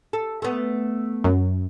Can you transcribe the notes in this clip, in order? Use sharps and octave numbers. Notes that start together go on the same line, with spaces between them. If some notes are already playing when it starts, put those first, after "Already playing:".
A4
A3 B3
F#2